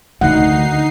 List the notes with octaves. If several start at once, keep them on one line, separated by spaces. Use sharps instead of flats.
D2 D3 D#3 D#4 F#5 C7